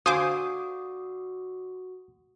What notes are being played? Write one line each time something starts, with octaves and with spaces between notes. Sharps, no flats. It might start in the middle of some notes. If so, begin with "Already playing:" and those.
D3 F#4 C5 F5 G#5 D6 D#6